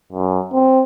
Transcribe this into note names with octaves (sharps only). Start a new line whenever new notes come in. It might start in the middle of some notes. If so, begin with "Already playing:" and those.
F#2
C4